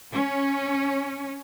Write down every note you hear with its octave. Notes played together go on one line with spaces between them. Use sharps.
C#4